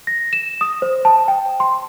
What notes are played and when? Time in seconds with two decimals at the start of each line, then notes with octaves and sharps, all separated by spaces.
0.07 A#6
0.33 E7
0.61 D#6
0.82 C5
1.05 A5
1.28 G5
1.60 C6